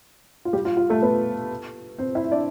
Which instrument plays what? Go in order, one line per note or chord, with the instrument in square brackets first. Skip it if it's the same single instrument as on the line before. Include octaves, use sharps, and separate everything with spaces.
[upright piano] F4
G3 G4
F4
F4
A3 A4
B3 B4
C4 C5
E4 E5
D4 D5